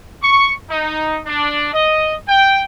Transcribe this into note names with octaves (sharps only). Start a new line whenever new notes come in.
C#6
D#4
D4
D#5
G5